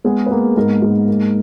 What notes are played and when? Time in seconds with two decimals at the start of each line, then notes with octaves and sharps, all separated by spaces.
0.04 G#3 B3 G#4
0.26 B4
0.31 A#3 B3 A#4
0.57 G#2 A#3 A#4
0.82 G#2
1.07 A#3